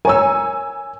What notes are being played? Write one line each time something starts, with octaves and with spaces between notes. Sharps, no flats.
A#4 C#5 G#5 E6